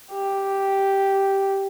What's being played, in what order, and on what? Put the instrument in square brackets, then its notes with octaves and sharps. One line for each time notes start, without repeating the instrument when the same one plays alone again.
[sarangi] G4